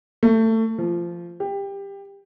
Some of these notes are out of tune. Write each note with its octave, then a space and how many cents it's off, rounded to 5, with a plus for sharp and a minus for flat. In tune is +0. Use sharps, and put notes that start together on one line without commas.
A3 +25
F3 -20
G4 +20